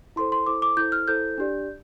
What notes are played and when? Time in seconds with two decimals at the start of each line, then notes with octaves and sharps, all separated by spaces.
0.16 E4 A4 C5 C6
0.32 C6
0.47 E4 A4 C5 D6
0.62 D6
0.77 E4 A4 C5 G6
0.92 F6
1.08 E4 A4 C5 G6
1.38 D4 G4 D5